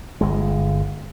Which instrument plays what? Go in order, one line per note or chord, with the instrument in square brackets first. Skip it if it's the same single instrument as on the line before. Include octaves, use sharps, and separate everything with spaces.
[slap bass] G1 G#3